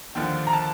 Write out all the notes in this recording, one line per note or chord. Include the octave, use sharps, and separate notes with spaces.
D#2 D3 F3 G5
A#5
A5